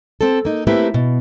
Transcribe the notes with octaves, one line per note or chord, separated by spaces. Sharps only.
C4 A4
A#3 D#4
A3 A#3 C4 E4 G4 B4
B2